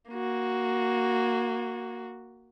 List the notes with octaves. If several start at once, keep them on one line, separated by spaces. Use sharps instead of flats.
A#3 F#4